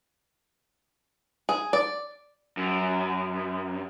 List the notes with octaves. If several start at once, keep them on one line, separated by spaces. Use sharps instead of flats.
G#4
D5
F#2